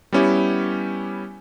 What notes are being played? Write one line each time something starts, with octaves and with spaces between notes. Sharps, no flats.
G3 B3 C#4 E4 G4